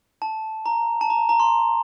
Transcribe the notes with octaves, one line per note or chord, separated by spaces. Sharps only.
A5
A#5
A5
A#5
A#5
C6